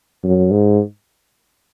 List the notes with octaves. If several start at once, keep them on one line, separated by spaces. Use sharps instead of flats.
F#2
G#2